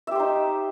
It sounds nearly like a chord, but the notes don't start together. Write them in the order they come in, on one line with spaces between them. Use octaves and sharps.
E5 G4 C5 D#4